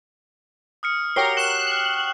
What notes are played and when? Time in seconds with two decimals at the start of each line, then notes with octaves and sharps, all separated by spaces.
0.83 D#6 F6 C#7
1.16 F#4 G4 A#4 C#5 C7 G7
1.37 C#6 F#6 E7 G7
1.71 F6